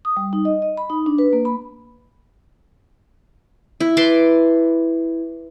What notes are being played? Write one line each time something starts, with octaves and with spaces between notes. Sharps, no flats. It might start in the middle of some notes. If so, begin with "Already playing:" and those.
D#6
G3
D#4
D#5
D#5
B5
D#4
D4
B4
A#3
B5
E4
B4 A5 C6 D6